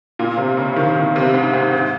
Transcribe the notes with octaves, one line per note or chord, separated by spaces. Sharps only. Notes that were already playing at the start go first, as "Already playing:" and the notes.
A#2
C3
C#3
D#3
D#3
C3
G#2
G#2
G#2